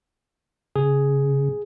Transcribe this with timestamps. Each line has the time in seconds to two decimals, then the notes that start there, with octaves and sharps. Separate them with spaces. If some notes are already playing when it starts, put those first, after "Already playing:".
0.76 C#3 G#4